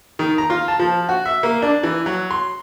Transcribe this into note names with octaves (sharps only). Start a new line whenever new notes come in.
D#3
A#5
F4
A5
F3
F#4
E5
A#3
D4
E3
F#3
C6